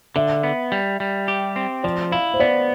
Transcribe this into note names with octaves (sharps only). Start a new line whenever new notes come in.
D3 E5
B3
G3
G3
G4
C4
F3 D5
E4 F5
C5
B3 D5